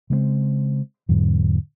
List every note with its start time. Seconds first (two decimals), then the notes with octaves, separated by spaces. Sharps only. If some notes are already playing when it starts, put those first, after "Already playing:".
0.10 C#3 G#3 A3 C4
1.09 E2 G#2 D3 F#3